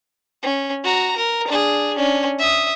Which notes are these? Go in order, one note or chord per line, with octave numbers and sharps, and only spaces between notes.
C#4
F#4 A#5
A#4
D4 G#4
C#4 D4
E5 D#6